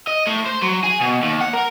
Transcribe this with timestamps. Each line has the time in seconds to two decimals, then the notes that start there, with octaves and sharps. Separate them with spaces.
0.08 D#5
0.27 A2
0.46 C5
0.63 F#3
0.84 G#4
1.00 B2
1.22 D#2
1.41 F#5
1.53 A#4